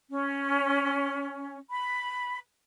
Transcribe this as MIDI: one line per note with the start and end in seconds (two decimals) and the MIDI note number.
0.10 1.58 61
1.71 2.39 83